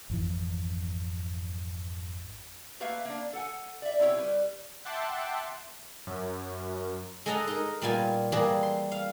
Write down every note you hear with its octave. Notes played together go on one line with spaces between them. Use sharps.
G#1 F2 E3
A3 A#3 B4 E5 F5
A#3 D4
A4 F#5 G#5
D5 E5
B2 C4 E4 G4 C#5 G5
G3 B4
E5 F#5 G5 A5 C6 D6
F#2
G#3 G#4 A4 D#5 F#5 A#5
D#4 A#4
A#2 G3 B3 F4 G#5
E3 G3 A#3 G#4 C5 D5
C6
F5